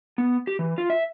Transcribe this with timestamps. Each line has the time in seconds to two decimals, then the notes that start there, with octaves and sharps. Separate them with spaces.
0.18 B3
0.47 G4
0.59 E3
0.78 F4
0.90 E5